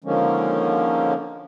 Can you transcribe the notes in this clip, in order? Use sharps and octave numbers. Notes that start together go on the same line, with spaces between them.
D3 D#3 F3 G#3 A#3 C#4